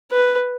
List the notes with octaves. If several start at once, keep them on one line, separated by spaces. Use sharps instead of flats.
B4